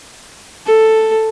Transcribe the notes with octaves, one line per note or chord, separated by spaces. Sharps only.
A4